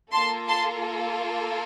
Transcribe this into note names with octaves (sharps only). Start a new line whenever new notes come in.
A#3 F4 A4 A5 C6
A5 C6